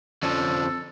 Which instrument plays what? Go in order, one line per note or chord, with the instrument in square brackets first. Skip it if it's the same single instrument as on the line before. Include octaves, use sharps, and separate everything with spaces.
[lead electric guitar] F2 F3 [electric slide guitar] D3 C#4 D5 [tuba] C4 [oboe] A4